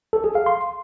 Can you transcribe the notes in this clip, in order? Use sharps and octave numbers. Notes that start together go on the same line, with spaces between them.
A4
G#4
F5
C6